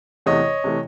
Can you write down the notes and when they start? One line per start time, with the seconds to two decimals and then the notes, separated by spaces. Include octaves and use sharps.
0.26 E2 C3 E3 A3 C#5 D#5
0.64 C3 E3 A3